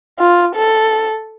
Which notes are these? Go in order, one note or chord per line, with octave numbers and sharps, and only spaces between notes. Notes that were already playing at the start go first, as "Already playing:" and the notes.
F4
A4